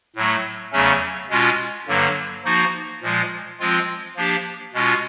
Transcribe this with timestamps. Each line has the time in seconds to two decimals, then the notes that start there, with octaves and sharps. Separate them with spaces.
0.16 A2 F#3 A3
0.73 E2 C#3 F#3 A3 C#4
1.30 B2 G#3 C#4 F4
1.88 G2 D3 F#3 A#3
2.45 F3 A#3 D#4 F#4
3.02 A#2 F3 G#3
3.59 F3 G#3 C4 F4
4.17 F3 A#3 D4 G4
4.73 B2 G#3 C#4 F4